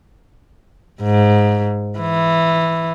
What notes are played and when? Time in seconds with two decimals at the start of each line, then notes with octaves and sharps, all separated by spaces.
1.02 G#2
1.99 E3